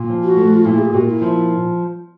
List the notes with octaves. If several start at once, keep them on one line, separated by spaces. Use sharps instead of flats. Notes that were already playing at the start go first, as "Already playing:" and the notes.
Already playing: A#2
F3
F#4
A3
F4
A#2 E4
G#4
G4
A#2 F#4
F4
E4
F3